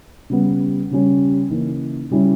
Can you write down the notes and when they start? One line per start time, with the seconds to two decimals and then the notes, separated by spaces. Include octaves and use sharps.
0.30 C#3 G3 B3
0.91 C#3 G3 C#4
1.51 C#3 E3 A#3 D#4
2.10 C#3 G3 C#4 E4